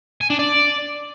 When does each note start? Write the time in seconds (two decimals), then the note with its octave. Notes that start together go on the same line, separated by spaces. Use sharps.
0.21 G#5
0.30 D4
0.39 D5